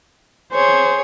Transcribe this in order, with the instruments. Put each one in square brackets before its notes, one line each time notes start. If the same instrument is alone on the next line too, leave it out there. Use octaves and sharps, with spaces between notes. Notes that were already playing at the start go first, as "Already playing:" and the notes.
[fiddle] G#4 C#5 [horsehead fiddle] C5